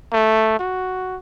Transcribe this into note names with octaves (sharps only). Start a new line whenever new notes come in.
A3
F#4